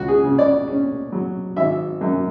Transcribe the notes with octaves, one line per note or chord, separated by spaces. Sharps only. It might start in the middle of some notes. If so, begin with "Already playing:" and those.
Already playing: C#2 F#4
G#4
C#3
D5
C#4
F#3
G#1 E5
F#2